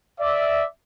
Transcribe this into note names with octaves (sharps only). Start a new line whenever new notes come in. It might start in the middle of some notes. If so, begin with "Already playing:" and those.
D5 E5